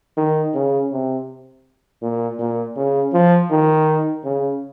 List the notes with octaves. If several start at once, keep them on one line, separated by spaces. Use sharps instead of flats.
D#3
C#3
C3
A#2
A#2
C#3
F3
D#3
C#3